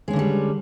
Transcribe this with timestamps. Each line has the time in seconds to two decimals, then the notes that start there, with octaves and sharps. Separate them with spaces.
0.08 G#3
0.11 C#4
0.13 D3
0.16 A#3
0.19 G3